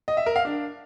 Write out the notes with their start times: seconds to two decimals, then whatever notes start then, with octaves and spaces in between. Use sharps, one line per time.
0.08 D#5
0.17 E5
0.26 A#4
0.36 F5
0.45 D4